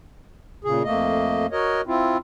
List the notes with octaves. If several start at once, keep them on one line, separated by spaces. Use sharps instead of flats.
A#2 C#3 G#4
F2 A3 A#3 D#5
F#4 A#4 C#5 D#5
C4 E4 F4